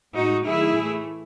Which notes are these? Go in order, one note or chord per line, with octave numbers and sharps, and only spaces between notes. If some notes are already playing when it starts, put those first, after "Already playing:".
A2 G#3 D#4 F#4
D#3 F#3 A3 E4 G#4
A2 E3 A3